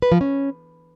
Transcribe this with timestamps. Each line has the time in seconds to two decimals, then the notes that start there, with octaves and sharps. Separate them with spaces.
0.02 B4
0.12 F3
0.21 C#4